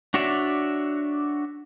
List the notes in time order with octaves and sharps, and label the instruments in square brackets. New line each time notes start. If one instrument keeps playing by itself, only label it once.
[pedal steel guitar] D4 F#4 C#5 D5 E5